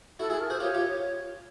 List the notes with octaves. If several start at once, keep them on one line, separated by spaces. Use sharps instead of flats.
E4 F#4 A4
E4 F#4 G#4
A#4
F#4 G#4 C5
F4 G4 C#5
F4 G4